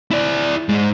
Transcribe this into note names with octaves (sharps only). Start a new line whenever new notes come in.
E4 D5
G#2 G#3